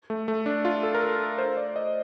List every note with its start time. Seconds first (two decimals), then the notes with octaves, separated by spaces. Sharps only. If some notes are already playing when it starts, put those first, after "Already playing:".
0.10 A3
0.28 A3
0.46 D4
0.65 F4
0.83 A4
0.94 A#4
1.02 A4
1.38 C5
1.57 D5
1.76 D#5